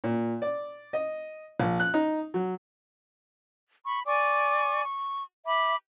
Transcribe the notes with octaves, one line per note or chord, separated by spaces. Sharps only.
A#2
D5
D#5
A#1
F#6
D#4
F#3
B5 C#6
D5 G#5 C#6 D6
C#6
E5 B5 D6